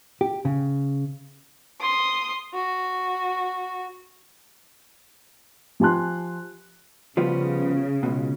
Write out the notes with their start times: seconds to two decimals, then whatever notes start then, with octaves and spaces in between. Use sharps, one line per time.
0.21 G4
0.45 C#3
1.80 C6 D#6
2.54 F#4
5.80 F3 G4 G#5 A5 C6 F#6
7.17 C#3 F3 G3 B3
8.03 C#2 B2